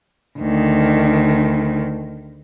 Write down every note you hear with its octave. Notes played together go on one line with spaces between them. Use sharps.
D2 D#3